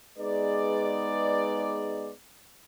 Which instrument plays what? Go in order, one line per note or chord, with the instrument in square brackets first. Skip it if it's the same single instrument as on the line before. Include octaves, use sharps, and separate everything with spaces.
[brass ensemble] G#3 B3 D#4 G#4 B4 D5